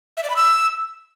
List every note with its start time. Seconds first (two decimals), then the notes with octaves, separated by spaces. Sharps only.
0.17 E5
0.23 D5
0.30 B5
0.36 E6